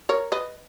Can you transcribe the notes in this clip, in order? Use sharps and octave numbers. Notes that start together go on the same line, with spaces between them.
A#4 C#5
B4 D#5